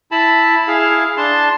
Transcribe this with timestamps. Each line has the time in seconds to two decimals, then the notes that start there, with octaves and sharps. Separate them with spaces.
0.11 E4 A5 B5
0.68 E4 G#4 F5
1.17 D4 A5 C6